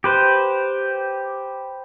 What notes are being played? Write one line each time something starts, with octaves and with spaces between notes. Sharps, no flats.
G4 B4 C5